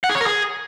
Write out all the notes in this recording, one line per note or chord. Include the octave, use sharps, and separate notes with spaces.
F#5
G#4
C#5
A#4
G#4